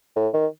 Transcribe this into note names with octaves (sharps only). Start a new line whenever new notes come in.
A2
D#3